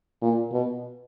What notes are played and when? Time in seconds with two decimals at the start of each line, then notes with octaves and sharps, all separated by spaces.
0.22 A#2
0.53 B2